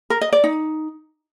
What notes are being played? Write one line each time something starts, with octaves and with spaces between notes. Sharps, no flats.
A#4
D#5
D5
D#4